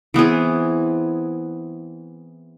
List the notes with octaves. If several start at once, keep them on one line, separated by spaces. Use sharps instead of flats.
E3 B3 C4 G#4